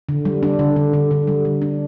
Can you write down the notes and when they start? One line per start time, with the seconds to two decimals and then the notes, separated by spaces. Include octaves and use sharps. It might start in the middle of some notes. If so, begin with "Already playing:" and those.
0.09 D3
0.25 G3
0.43 D4
0.59 D3
0.76 D3
0.93 D3
1.11 D3
1.27 G3
1.45 D3
1.62 D4